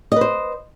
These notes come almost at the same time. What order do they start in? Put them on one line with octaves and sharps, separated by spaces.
D#5 B4 C5